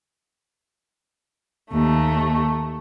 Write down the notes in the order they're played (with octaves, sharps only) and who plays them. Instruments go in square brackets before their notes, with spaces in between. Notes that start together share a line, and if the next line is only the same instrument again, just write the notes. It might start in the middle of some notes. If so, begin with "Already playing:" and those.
[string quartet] D#2 A3